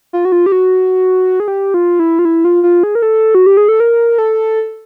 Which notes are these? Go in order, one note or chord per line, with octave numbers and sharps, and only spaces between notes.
F4
F#4
F4
G4
F#4
G#4
G4
F4
E4
F4
E4
F4
F4
G#4
A#4
A4
F#4
G4
G#4
A4
A#4
A4